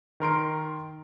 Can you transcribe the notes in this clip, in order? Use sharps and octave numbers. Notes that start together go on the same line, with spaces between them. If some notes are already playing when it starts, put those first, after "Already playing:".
D#3 A#4 C6 D7